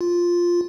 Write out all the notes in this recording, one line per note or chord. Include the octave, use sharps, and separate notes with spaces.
F4